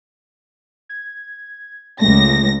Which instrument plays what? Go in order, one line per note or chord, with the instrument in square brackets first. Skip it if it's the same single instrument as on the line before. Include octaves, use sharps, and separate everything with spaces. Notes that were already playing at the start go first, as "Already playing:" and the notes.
[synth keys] G#6
[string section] C#2 A#6 [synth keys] G#3 A3